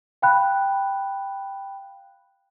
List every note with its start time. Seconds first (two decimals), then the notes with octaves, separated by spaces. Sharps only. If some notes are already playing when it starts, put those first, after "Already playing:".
0.22 F5 G5 B5 F#6